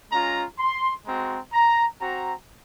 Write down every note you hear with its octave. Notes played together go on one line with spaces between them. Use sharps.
G#3 C#4 F4 A#5
C6
G#3 C4 F#4 A#5
A#5
C4 F#4 A#5